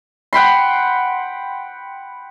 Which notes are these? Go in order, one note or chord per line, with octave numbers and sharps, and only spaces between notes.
F#5 G5 B5 C6